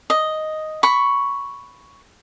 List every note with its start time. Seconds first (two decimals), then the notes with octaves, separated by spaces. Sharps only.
0.10 D#5
0.83 B5 C#6